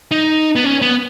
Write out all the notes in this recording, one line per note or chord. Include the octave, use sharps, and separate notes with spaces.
D#4
B3
C#4
B3